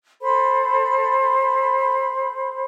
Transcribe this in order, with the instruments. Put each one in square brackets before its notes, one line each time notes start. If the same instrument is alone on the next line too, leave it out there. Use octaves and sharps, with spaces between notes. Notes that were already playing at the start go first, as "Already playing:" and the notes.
[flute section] A4 C5 B5